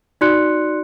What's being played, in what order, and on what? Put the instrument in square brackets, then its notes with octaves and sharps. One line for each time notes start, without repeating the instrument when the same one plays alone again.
[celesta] D#4 F#4 D5 C6 F#6 C#7